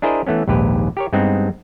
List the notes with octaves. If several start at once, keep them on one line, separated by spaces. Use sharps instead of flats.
D4 E4 G#4 A#4 C5 D#5
E3 A3 B3 C#4
A#1 D#2 G#2 G4 B4
G4 A#4 C#5
G2 G#3 B3 C4 D#4